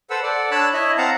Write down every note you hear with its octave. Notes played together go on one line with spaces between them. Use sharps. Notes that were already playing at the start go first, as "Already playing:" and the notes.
A4 B4 C5 F#5 E6
A4 D5 F#5
D4 C#5 A5 B5 E6 F#6
E4 C#5 D#5 E5
C4 F5 F#5 A5 A#5